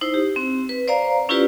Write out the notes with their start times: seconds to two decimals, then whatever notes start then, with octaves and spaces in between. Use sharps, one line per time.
0.01 D#4 E4 C5
0.14 G4
0.36 C4
0.69 B4
0.87 C5 D5 F5 A#5
1.29 C#4 E4 F4 G4 B4 D5